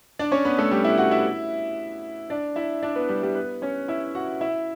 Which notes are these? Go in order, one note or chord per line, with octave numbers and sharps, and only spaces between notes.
D4 D5
C#4 C#5
B3 B4
A3 A4
G3 G4
E4 E5
F#4 F#5
E4 E5
D4 D5
E4 E5
D4 D5
B3 B4
G3 G4
G3 G4
B3 B4
C#4 C#5
E4 E5
F#4 F#5
E4 E5